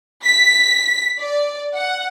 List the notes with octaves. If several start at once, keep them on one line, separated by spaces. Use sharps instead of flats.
B6
D5
F#5